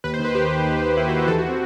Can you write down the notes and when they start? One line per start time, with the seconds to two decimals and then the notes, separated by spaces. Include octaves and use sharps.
0.04 D#2 B4
0.14 C5
0.20 D#3
0.25 B4
0.35 D#3 G4
0.50 D#3
0.66 D#2
0.81 D#2
0.97 D#2 E4
1.07 F#4
1.13 D#3
1.18 G4
1.28 E3 A4
1.38 F#4
1.49 C4